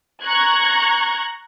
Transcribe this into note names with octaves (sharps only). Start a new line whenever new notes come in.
A#5 C#6 F#6 G#6